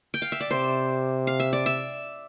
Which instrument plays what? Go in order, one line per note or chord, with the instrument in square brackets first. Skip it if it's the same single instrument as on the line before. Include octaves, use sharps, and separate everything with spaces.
[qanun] G5
F5
E5
D5
[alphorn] C3 [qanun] C5
[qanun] F5
E5
D5
E5